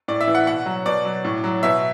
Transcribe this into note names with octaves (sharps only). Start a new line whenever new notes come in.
A2 D5
E5
E3
F#5
B2 F#5
F#3
B2 D5
F#3
A2
F#3
B2 E5